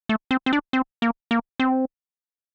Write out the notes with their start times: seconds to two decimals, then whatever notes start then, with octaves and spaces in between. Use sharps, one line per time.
0.09 A3
0.31 C4
0.46 C4
0.53 D4
0.73 C4
1.02 A#3
1.31 A#3
1.60 C4